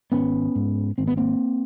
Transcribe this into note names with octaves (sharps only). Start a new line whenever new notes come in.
G#1 B3 C#4
G#2
G#1 C4
B3
A#3 C4